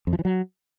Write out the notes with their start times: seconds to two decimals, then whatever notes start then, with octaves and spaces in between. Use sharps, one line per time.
0.07 F2
0.13 F3
0.19 E3
0.25 F#3